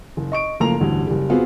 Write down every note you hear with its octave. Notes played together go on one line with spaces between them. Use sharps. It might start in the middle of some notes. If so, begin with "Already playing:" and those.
F#1
D#5 C#6 D7
F#1 F3 A3 A#3 A#5 F7
A1 D2 G2
F#1 G3
B3 C4 F4 F#4 G#4